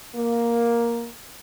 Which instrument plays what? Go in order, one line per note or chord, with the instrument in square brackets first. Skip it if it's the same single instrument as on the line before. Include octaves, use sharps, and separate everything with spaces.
[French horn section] A#3